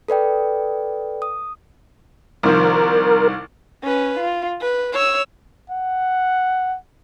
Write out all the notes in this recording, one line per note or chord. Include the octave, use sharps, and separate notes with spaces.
A4 B4 D5 G5
D#6
C2 D#3 F3 A#4
C#4 B4
F4
B4
C#5 E6
F#5